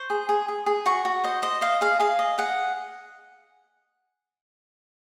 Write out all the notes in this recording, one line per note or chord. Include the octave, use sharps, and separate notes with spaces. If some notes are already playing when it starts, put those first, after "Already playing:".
Already playing: C5 C#6
G#4
G#4
G#4
G#4
F#4 C#6
F#4
C5 D#5
C5 D#5
D#5 F5
G#4 F5
G#4 F5
D#5
G#4 F#5